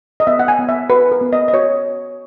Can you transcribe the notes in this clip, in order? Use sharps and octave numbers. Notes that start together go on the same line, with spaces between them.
D#5
B3 E5
F#5
G#5
B3
E5
F#4 B4
A#4
B3
D#5
D#5
F#4 C#5